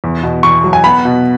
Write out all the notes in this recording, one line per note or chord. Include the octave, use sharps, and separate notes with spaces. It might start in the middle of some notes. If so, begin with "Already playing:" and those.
E2
B2
E2 C#6
F#3
G#5
B3 B5
B2